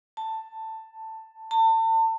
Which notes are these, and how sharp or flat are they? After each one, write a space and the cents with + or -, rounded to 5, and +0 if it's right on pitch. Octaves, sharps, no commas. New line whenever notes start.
A5 +10
A5 +35